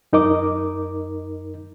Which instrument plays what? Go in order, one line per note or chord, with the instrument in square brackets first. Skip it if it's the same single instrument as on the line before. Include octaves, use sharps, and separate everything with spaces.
[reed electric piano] F#2 D#4 A#4 D#5 D6